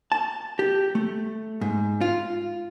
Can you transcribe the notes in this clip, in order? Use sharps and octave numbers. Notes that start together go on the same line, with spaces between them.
A5
G4
A3
G#2
F4